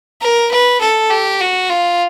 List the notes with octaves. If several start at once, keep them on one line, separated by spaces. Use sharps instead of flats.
A#4
B4
A4
G4
F#4
F4